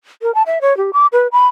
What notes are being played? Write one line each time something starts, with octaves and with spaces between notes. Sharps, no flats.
A#4
A5
E5
C#5
G4
D6
B4
B5